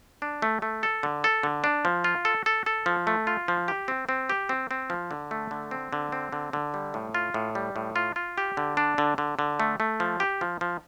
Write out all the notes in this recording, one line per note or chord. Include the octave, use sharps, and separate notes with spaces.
D4
A3
A3
A4
D3
A4
D3
D4
F3
F4
A4
A4
A4
F3
A3
F4
F3
G4
C4
C4
G4
C4
C4
F3
D3
A3
D3
C4
D3
C4
D3
D3
G3
A2
F4
A2
G3
A2
F4
F4
G4
D3
D4
D3
D3
D3
A3
A3
F3
G4
F3
F3